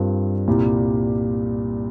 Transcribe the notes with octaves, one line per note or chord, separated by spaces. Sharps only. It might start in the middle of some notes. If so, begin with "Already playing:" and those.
Already playing: G2 G3 C4 F4 A#4
C2 A#2 G3